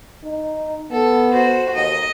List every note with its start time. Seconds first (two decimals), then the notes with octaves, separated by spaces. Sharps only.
0.24 D#4
0.91 B3 A4
1.32 F#4 C5
1.75 D#2 D#5